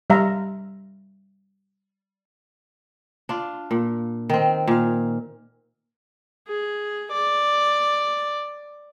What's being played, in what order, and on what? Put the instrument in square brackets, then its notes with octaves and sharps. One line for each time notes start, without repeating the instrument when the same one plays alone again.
[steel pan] G3 E5 F5 A#5
[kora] D4 F4
A#2
D#3 C4
A#2 F5
[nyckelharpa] G#4
D5